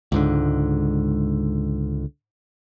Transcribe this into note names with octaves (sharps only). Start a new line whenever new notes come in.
C#2 G#2 D3